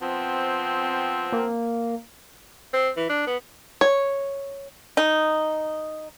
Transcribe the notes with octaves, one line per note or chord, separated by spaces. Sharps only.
F3 B3 C4
A#3
C4
E3
D4
B3
C#5
D#4